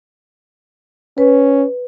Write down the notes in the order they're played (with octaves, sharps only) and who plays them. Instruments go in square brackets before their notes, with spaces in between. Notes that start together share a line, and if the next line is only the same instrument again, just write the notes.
[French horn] C#4 [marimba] B4